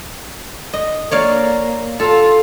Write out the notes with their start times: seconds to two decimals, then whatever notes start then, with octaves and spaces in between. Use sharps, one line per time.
0.73 D#5
1.11 A#3 C#5 D5 F5
2.00 F4 A4